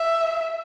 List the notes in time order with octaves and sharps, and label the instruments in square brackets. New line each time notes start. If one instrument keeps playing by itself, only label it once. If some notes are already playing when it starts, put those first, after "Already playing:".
Already playing: [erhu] E5